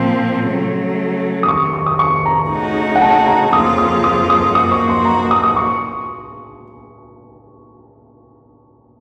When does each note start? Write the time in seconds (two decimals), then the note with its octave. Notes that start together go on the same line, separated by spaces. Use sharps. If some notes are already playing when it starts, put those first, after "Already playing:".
Already playing: A#2 F3 C4
0.46 C#3 F#3 A3
1.43 D#6
1.48 F2 C3 D#3 C#6
1.73 C#6
1.86 D#6
1.99 C#6
2.26 A#5
2.50 C#3 A3 D#4 F#4
2.96 F#5
3.02 A5
3.27 A#5
3.53 F2 C#3 F3 A#3 F4 D#6
3.78 D#6
4.04 D#6
4.30 D#6
4.54 F#2 F3 A#3 D#4 F#4 D#6
4.72 C#6
4.89 C6
5.05 A#5
5.31 D#6
5.43 D#6
5.56 C#6